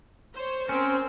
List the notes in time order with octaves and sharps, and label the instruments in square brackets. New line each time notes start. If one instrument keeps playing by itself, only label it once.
[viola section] C5 C#5
[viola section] C4 A#4 C5 [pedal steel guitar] C#4